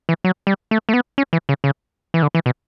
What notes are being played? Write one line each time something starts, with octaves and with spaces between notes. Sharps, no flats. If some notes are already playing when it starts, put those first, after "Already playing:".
E3
F#3
G3
A3
A3
B3
C#4
E3
C#3
C#3
E3
D3
E3
B2